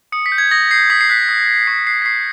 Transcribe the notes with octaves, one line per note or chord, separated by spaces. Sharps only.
D#6 C#7
B6
G6
G#6
D#6 A#6
G6 C7
D#6 B6
C7
F#6 B6
D#6
F#6
C#6 C7
F#6 C7
B6
C#6 C7